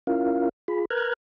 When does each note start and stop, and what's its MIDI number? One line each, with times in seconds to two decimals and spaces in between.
0.07 0.49 61
0.07 0.49 64
0.07 0.49 65
0.07 0.49 70
0.07 0.49 77
0.68 0.85 65
0.68 0.85 68
0.68 0.85 83
0.91 1.13 70
0.91 1.13 71
0.91 1.13 82
0.91 1.13 89
0.91 1.13 90
0.91 1.13 92